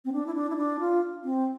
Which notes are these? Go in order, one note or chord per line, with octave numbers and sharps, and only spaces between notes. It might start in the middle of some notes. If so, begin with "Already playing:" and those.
C4
D4
E4
D4
E4
D4
F4
C4